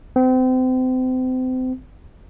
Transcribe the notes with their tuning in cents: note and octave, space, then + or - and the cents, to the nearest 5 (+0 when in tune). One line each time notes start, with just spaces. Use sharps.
C4 -35